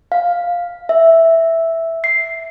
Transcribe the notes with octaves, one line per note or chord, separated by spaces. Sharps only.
F5
E5
C7